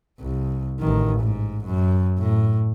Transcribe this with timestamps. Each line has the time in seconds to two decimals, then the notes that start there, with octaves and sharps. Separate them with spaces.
0.20 C2
0.79 A1 D#3
1.20 G#2
1.65 F#2
2.18 A2